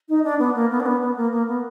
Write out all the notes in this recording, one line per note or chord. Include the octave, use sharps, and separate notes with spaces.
D#4
D4
B3
A#3
B3
D4
B3
B3
A#3
A#3
B3